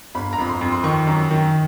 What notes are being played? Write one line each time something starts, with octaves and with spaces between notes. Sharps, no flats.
G1 B5
A#5
F2 B5
C6
F2
C6
D#3 C#6
F#2
D#3